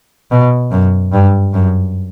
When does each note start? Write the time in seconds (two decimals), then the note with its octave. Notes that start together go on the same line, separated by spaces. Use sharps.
0.31 B2
0.72 F#2
1.13 G2
1.53 F#2